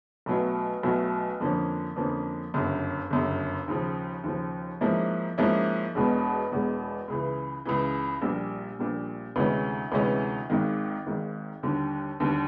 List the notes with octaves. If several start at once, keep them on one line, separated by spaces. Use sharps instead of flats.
B1 B2 F#3 A3
B1 B2 F#3 A3
F2 D3 F3 A#3 C#4
F2 D3 F3 A#3 C#4
G1 F#2 C#3
G1 F#2 C#3
D#2 C#3 F3
D#2 C#3 F3
G#2 F3 A#3 C#4 E4
G#2 F3 A#3 C#4 E4
E1 E2 B2 G#3
E1 E2 B2 G#3
C#2 C#3 E3
C#2 C#3 E3
A#1 A#2 G3
A#1 A#2 G3
D2 C3 E3 G#3 C#4
D2 C3 E3 G#3 C#4
G#1 G#2 D#3
G#1 G#2 D#3
D#2 D3 G3
D#2 D3 G3